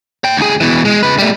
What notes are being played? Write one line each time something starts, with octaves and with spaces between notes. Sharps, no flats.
C#5 G5
D2 G#4
B2 E3
G#3
C#3 B4
G3 A3